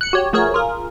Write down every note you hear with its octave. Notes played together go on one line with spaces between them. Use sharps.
F#6 C#7
F#4 G4 C#5
F3 A3 F#4 G#4 A#4 C#5
F4 G#4 A#4